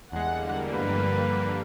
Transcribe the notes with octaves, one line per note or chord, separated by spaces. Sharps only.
E2 D3 G3 G#3 A#3 F#5
G2 F3 B4